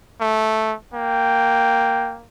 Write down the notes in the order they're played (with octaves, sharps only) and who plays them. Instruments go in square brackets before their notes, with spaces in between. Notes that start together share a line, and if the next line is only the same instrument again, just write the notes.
[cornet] A3
[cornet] A#3 [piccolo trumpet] G5